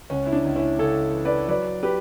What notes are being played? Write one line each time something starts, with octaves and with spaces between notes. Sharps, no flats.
C#2 C#4
E4
D4
C#2
C#4 E4
C#3 A4 C#5
E3
B4 D5
F#3 B4 D5
G4 B4